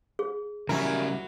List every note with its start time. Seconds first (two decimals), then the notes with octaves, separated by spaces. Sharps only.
0.19 G#4
0.69 C#3 F#3 G3 E4 A#4 G#5